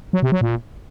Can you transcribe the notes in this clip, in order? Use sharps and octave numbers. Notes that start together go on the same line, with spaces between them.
F#3
C3
F#3
A#2